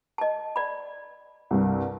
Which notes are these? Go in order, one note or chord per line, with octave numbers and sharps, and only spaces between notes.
D#5 A5
D5 B5
C2 G2